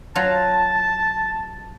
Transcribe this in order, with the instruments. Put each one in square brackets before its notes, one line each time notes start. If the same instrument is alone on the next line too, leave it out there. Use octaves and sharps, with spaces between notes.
[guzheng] F#3 F4 [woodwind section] A5